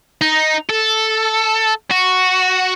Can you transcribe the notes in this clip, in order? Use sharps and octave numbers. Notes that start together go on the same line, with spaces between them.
D#4
A4
F#4